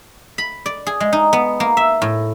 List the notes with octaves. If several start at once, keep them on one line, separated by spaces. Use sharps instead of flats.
B5
D5
G#4
G#3
D#4
B3
A#3
E5
A2